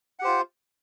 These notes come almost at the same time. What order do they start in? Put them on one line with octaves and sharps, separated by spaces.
F#5 G4 C5 F4